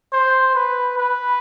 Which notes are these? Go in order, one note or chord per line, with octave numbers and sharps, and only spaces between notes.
C5
B4
B4